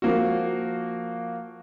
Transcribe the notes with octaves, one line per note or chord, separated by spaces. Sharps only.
F3 A#3 F#4